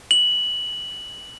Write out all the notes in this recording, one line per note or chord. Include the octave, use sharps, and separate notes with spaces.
F#7